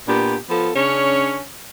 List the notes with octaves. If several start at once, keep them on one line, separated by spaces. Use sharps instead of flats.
A#2 B3 D4 G4
F3 B3 F4 A4
C#3 C#4 D4 C#5